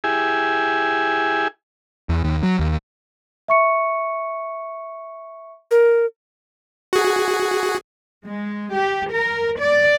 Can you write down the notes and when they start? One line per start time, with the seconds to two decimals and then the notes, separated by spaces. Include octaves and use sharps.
0.04 E4 G4 G#4 E5 G#5
2.09 E2
2.24 D#2
2.43 F#3
2.59 D#2
3.48 E5 C#6 C#7
5.71 A#4
6.93 F#4 G#4
8.25 G#3
8.74 G4
9.10 A#4
9.59 D5